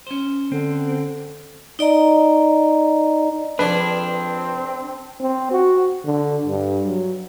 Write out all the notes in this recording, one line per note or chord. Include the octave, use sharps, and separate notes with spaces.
C#4 C5
D3 C4
D#4 D5 D#5 A#5
F2 C4 D4 G#4 B4 D5
C4
F#4
D3
G2
F#3